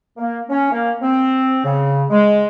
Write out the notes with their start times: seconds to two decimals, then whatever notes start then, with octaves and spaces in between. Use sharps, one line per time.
0.18 A#3
0.50 C#4
0.71 A#3
1.02 C4
1.64 C#3
2.10 G#3